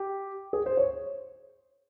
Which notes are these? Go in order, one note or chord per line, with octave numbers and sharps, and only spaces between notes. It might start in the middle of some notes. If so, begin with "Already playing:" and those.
Already playing: G4
G#4
C5
C#5